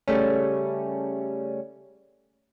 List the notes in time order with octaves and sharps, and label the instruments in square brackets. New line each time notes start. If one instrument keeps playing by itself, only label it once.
[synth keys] C#3 G3 A3 C#4